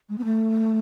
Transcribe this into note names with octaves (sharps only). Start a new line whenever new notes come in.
G#3
B3
A3